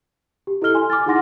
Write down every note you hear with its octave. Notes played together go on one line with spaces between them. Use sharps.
G4
E4 A4 D#5 F6 G7
G#5 C6
D6 F6 A6
D#4 E4 G#4 F#5 C6 A#6